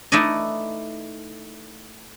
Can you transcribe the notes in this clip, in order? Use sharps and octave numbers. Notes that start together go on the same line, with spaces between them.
A3 D#4 E4 B4 D5 D#5